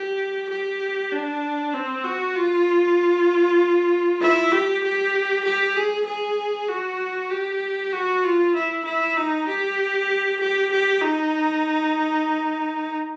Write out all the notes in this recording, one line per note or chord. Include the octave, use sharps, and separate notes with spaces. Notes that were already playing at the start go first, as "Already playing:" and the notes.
Already playing: G4
G4
D4
C4
F#4
F4
E4
G4
G4
G4
G#4
G#4
F#4
G4
F#4
F4
E4
E4
D#4
G4
G4
G4
D#4